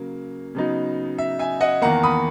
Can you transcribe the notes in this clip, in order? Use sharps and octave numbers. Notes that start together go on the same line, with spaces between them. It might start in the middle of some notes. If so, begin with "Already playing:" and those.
Already playing: C#3 F#3 A#3
C#3 F#3 B3 D#4
E5
E5 G#5
D#5 F#5
E2 D#3 A#3 F#5 A#5
B5 D#6